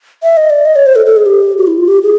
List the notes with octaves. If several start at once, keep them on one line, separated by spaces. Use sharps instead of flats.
E5
D#5
D5
D#5
C#5
C5
A4
A4
G#4
G4
F#4
E4
F4
G4
G#4